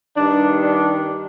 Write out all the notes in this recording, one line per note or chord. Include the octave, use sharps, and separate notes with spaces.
G2 D#3 D4
D4